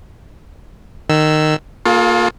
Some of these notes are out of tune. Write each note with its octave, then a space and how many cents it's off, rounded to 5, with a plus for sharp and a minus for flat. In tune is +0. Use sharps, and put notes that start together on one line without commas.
D#3 -15 E6 +0
A#3 +0 F4 +30 A4 -45